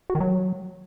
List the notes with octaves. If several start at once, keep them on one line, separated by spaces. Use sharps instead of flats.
F#4
D#3
F#3